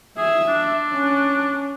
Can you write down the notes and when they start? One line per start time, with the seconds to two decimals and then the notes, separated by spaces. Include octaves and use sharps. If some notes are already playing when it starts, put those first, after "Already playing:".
0.18 G#4 E5
0.49 D4
0.93 C#4